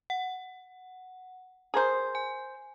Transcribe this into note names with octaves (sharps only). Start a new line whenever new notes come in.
F#5
G#4 A#4 C5
G#5